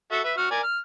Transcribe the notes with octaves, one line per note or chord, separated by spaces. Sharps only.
F#4 A4 E5
B4 E5
F#4 F6
A#4 D5 G#5
F6